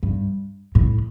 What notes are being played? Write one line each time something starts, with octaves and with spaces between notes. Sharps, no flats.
G2
A2